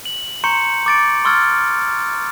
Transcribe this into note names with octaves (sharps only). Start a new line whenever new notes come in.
F#7
A#5 C6 C#6 G6 C#7
D6 A6 D7
C6 C#6 E6 F6 G#6 A6